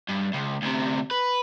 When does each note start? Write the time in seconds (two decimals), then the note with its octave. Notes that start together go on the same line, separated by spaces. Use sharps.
0.10 G2
0.34 C#2
0.62 D2 C3
1.11 B4